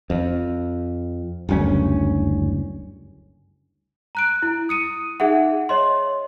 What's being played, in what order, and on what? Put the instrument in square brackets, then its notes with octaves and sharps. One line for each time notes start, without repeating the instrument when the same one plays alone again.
[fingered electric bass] F2
F#1 D2 G2 C#4
[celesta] A#5 F#6 D7
E4
D#6 C#7 D#7
D#4 G#4 E5 F#5
C#5 D#5 C6